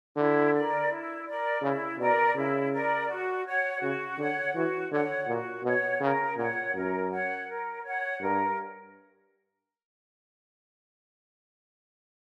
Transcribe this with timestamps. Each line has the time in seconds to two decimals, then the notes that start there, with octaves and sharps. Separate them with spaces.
0.16 D3 E4
0.53 A#4 D5
0.90 E4
1.26 A#4 D5
1.62 C#3 E4
1.98 B2 A#4 D5
2.35 C#3 E4
2.72 A#4 D5
3.08 F#4
3.46 C#5 F#5
3.81 C#3 F#4
4.18 D3 C#5 F#5
4.54 E3 F#4
4.91 D3 C#5 F#5
5.27 A#2 F#4
5.64 B2 C#5 F#5
6.00 C#3 A#4
6.37 A#2 C#5 F#5
6.75 F#2 A#4
7.11 C#5 F#5
7.48 A#4
7.83 C#5 F#5
8.20 G2 A#4